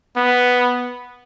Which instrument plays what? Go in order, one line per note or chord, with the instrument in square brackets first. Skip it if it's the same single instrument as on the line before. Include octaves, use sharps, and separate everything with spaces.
[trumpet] B3